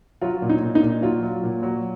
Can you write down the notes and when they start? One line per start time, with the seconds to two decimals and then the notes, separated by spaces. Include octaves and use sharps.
0.22 F#3 F4
0.42 A#2
0.49 D#4
0.62 A#2
0.75 D#4
0.82 A#2
1.02 F#3 F4
1.23 F#3
1.43 A#2
1.63 F#3